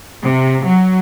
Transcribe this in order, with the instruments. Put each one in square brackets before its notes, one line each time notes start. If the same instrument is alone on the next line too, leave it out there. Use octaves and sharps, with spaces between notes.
[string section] C3
F#3